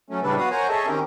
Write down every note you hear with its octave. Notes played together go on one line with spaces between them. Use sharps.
F#3 A3 C#4
A2 C#3 G3 D4 A4 B4
F#3 B3 F#4 B4 F5 D#6
A#4 C5 C#5 F#5 G#5 A#5
G#4 A4 C#5 D#5 E5 A5
D#3 C4 C#4 G4 A#4